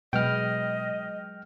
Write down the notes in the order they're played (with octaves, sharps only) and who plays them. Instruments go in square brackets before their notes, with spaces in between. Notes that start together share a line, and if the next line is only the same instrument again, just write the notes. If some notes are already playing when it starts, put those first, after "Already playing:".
[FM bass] B2 [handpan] F#3 G#3 B4 [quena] D#5 [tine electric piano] G5 F6